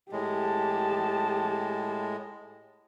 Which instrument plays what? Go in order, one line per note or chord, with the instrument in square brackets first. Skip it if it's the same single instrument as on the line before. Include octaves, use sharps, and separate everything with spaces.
[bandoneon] A2 G#3 [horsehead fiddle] G4 A5